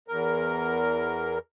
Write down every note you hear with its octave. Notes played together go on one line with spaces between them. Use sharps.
E2 A#4